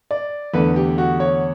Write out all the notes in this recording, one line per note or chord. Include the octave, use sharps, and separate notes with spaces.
D5
E2 D3 A3 B4
G4
F#4
C#5